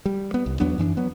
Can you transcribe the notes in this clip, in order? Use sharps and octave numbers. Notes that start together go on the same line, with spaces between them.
G3
B3
C2
E2 F#3 B3 D4
F#2 E3 C4 D4
F#3 B3